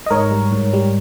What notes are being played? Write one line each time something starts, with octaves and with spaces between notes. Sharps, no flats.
D#5
G#2 A#4 C#5
G3
G#2
G3